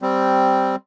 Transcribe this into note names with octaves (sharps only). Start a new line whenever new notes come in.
G3 C4